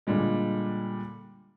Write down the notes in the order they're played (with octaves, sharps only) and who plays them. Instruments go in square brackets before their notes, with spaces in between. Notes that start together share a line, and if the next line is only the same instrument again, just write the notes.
[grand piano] A#2 D3 G3 G#3